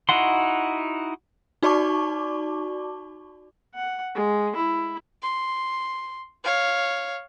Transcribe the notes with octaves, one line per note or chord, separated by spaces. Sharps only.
D#4 E4 F#4 F#5 C6
D#4 F#4 D5 A5 C#6 D6
F#5
G#3
E4
C6
C#5 F5